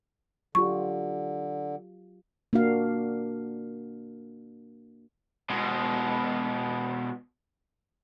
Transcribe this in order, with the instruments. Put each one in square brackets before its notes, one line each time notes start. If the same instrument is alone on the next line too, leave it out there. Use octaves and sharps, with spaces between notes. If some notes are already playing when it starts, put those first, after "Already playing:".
[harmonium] D3 [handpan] F#3 F4 G4 [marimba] C#6
[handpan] A#3 D4 F#4 F5
[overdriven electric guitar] B2 G#3